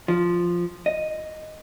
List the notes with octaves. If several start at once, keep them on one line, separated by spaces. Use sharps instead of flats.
F3
D#5